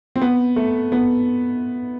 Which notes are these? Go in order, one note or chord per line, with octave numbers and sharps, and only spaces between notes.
C4
B3
A3
B3